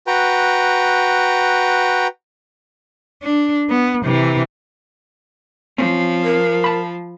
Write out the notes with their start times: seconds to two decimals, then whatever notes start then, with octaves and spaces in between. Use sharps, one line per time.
0.07 F#4 B4 G5 A#5
3.23 D4
3.70 B3
4.04 C3 E3
5.78 F3 C4 C#4
6.24 A#4
6.64 A5 B5